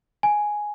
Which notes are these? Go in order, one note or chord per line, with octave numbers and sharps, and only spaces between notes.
G#5